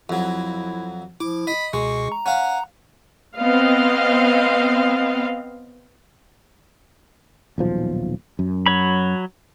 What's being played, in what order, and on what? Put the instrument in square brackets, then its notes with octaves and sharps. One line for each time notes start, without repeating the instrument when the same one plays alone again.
[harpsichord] F2 F#3 [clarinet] E4
[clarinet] F3 [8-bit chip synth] E4 [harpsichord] D6
[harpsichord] D#5 [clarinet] B5
[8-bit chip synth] C#2 B2 [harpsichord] G#3 [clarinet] C#6
[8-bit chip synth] A#5
[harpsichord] C#4 F5 [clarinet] F#5
[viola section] B3 C4 D#5 F5
[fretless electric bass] D#1 B1 F3
F#2
[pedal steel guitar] F#3 C#5 B5